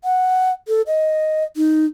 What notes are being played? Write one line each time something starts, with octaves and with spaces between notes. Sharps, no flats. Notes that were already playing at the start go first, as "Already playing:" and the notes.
F#5
A4
D#5
D#4